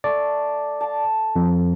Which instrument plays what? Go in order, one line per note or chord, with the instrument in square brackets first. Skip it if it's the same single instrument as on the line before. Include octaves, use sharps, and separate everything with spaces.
[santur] A3 [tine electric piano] D5
[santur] F5 A5
[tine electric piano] F2 [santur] A#4